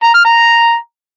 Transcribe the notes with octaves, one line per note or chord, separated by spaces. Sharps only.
A#5
F6
A#5